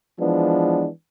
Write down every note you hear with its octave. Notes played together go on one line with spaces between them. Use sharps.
E3 F3 G#3 B3 D4